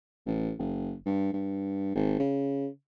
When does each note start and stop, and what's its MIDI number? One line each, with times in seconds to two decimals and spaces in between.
0.26 0.52 33
0.59 0.94 30
1.06 1.33 43
1.33 1.95 43
1.95 2.17 32
2.19 2.68 49